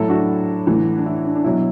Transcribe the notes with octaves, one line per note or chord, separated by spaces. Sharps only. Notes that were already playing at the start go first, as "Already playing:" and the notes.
Already playing: A2 F#3 E4 A4
D4 F#4
A2 E3
D4
E4
D4
D4
B2 F#3 E4